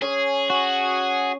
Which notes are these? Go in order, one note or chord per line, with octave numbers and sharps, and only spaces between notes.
C#4 G#4 C#5
F#4